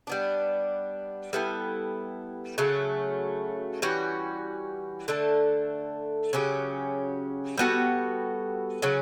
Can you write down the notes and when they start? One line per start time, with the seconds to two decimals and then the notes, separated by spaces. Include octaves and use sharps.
0.07 G3 B3 D4
1.33 G3 B3 E4 A4
2.58 C#3 F#3 A3
3.82 E3 G3 C#4 F#4
5.08 D3 A3 D4 A4
6.33 C#3 F#3 C#4 G4
7.57 G3 B3 F#4 A4
8.82 C#3 F#3 C#4